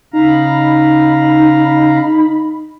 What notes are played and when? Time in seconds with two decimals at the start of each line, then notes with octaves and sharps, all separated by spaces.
0.13 C#3 D#4 F5 A#5 B5